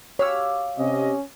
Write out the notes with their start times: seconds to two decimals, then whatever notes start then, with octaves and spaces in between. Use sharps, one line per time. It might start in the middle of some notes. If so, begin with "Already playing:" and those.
0.19 G4 C#5 F5 E6
0.78 C3 C#4 D#5